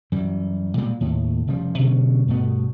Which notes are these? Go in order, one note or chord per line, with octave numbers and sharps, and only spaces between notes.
F#2 E3 G3
A#2 G3 G#3
D#2 A2
F1 C#3 F3 G3
B2 D3 F#3 C#4
G2 B2 A3 B3